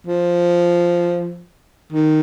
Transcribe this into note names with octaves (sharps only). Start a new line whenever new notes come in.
F3
D#3